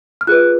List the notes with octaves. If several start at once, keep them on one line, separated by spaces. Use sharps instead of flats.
F6
F4 G#4 B4 F#6